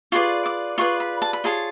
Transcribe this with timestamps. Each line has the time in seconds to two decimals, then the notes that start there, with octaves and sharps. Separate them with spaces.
0.12 F4 G#4 B4 D5 C#6
0.46 D6
0.78 F4 G#4 B4 D5 C#6
1.00 B5
1.22 A5
1.33 B5
1.44 F4 G#4 C#5 A5